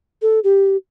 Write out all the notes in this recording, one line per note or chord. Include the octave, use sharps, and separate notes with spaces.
A4
G4